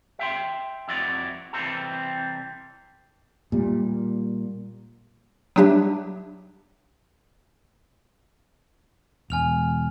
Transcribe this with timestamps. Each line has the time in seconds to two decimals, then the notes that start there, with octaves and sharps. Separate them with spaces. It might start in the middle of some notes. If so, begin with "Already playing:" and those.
0.19 E5 G5 C6
0.88 F2 E4 F#4 D5
1.53 C3 E3 G3 C4 A4
3.52 A#2 G3
5.56 F#3 G3 D4 G4 E5
9.30 E1 G#5 F6 F7